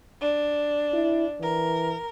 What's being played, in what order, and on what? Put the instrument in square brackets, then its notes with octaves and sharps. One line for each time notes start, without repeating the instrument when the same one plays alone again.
[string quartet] D4
[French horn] E4
[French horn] E3 [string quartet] A#4